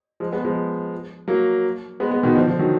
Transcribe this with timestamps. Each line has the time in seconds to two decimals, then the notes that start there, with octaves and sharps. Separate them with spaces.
0.20 F3 G#3
0.32 G#3 B3
0.45 F3 G#3
1.28 F#3 A#3
2.00 G#3 B3
2.11 G#3 B3
2.23 B2 D#3
2.36 D3 F3
2.47 D3 F3
2.59 D#3 F#3